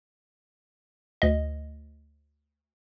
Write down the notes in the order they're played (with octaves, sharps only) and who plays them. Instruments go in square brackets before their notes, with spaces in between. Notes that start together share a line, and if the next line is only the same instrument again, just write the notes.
[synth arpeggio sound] D2 D#5